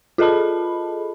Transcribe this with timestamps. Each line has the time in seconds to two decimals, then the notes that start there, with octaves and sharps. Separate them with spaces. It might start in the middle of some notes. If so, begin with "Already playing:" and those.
0.18 F4 G#4 A4 D#5 A5 B5